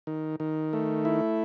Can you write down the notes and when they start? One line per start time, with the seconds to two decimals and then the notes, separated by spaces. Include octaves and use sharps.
0.07 D#3
0.40 D#3
0.73 A3
1.05 E4